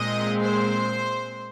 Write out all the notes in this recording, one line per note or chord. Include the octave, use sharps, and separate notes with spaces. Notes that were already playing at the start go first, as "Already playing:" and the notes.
Already playing: A#2 G#3 C4 D#5
C5